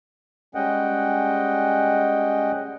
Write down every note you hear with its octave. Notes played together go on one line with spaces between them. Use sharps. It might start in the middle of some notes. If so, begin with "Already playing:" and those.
G3 G#3 C#4 D#5 F#5 G5